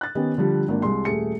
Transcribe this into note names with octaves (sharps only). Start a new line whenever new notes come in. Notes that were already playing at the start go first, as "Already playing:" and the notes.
F#6 A6
D#3 B3 C#4 G4
D3 F3 G3
G#1 A#3 D4
C2 G#3 C6
D#1 A3 G#4 C#7